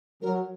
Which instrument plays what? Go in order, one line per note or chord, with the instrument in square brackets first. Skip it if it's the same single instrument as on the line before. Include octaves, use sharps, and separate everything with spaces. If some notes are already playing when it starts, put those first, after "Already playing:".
[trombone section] F#3 [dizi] A#4